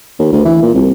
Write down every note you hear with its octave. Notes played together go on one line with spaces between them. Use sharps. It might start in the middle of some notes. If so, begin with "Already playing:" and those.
D#2
D2
E3
A#2
C2